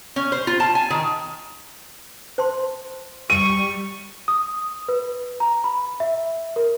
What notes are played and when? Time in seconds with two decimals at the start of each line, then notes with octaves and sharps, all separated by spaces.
0.16 C#4
0.32 C5
0.47 F4
0.60 A5
0.75 G#5
0.90 D#3
2.38 C5 A5 C6
3.30 G3 C#6 D#7
4.28 D#6
4.88 B4
5.40 A#5
5.64 B5
6.00 E5
6.56 A#4